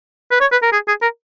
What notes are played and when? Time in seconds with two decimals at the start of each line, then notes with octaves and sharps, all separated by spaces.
0.31 B4
0.41 C#5
0.52 B4
0.62 A#4
0.72 G#4
0.88 G#4
1.02 A#4